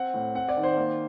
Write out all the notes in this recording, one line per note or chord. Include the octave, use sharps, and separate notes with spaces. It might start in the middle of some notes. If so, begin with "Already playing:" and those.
Already playing: C4 F#5
A2
C4 F#5
D5
D#3
C5
A#3